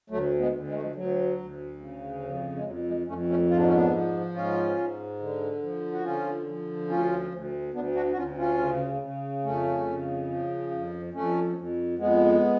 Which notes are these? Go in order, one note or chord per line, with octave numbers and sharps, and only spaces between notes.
D2 F#3 A3
G#3 B3
D2
G#3
A3
F3 G#3
D2 F#3
D2
C#3
F2
G#3
F2 F#3
F3 G#3
F2 A3 C#4
A3 C#4
G#2 F4
D4
C#4
B3 D4
F3
G#2 C#4 F4
G#2
D3
F3
F#4
D3 C#4 F4
F3
D2 C#4 F4
D2
D2 B3 D4
D4 F#4
F#4
D2 C#4 F4
C#4 F4
C#3
C#3
F2 A3 C#4
C#3
F3
F2
F2 A3 C#4
F2
F2 G#3 B3